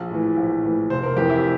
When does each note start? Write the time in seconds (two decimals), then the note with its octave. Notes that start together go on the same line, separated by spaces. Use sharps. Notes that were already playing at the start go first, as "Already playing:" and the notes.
Already playing: A#1
0.11 A2 E3
0.37 A#1
0.63 A2 E3
0.90 F1 C5
1.03 A#4
1.17 F2 E3 G4
1.30 E4